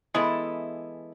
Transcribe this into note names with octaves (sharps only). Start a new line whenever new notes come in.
E3 G#3 B3 E4 A4